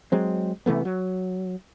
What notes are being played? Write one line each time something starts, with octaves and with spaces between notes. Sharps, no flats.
F#3 G#3 C4
C3 E3 A3 B3
F#3